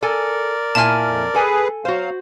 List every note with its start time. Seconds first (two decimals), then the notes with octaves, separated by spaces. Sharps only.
0.03 A4 A#4 D5 G#5
0.75 A#2 E4 G#5 A5 F6
1.06 F2
1.35 G#4 A4 B4 G#5
1.85 F#3 F#4 C5 F5